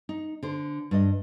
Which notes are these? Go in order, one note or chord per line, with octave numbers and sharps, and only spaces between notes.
D#4
D3 C5
G2 D4 D#5